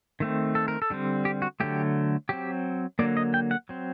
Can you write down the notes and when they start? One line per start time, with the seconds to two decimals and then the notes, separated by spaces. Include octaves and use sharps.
0.20 D#3 A3 C4
0.55 A4
0.68 A#4
0.82 A4
0.90 D3 G3 C4
1.25 G4
1.42 F#4
1.60 D3 F#3 A3 G4
2.29 F#3 C4 G4
2.99 D3 F#3 A#3 D5
3.17 D#5
3.34 G5
3.51 F#5
3.69 F#3 C4